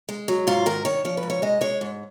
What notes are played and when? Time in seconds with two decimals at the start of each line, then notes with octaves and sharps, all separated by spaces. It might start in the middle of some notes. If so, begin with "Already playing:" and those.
0.09 G#3
0.28 F#3
0.47 G#2 F4
0.66 D#3 A#4
0.85 D#3 C#5
1.05 F3 C#5
1.17 B4
1.23 G#2
1.30 C#5
1.42 G#3 D#5
1.61 G#3 C#5
1.81 G#2